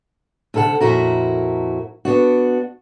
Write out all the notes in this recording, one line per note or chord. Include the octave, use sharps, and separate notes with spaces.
D2 C3 A4 B4 F#5
F2 A#2 E4 F#4 A#4
B3 D4 F#4